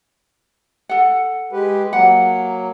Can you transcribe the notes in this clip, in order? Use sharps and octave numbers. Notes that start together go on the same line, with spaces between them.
A4 F#5
G#3 G4 B4
F#3 A#3 F#5